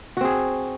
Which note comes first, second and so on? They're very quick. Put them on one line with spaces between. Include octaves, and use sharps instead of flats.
F#4 C4 G#4